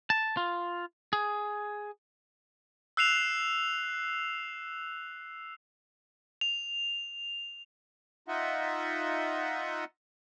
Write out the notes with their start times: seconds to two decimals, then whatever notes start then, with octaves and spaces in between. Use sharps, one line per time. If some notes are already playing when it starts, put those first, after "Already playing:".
0.10 A5
0.37 F4
1.13 G#4
2.97 E6 F#6 C7 E7 F7
6.41 F7
8.28 D#4 F4 D#5 E5 F#5